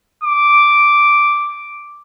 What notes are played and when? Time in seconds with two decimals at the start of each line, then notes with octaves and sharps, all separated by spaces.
0.23 D6